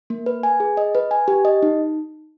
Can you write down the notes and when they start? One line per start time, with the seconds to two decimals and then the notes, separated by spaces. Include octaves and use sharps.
0.10 A#3
0.26 B4
0.43 G#5
0.60 G#4
0.77 D#5
0.95 B4
1.11 G#5
1.28 G4
1.45 D#5
1.62 D#4